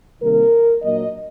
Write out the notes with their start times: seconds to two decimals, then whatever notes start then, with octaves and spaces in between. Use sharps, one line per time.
0.21 C3 D#3 G3 A#3 A#4
0.83 A#2 F#3 A#3 D4 D#5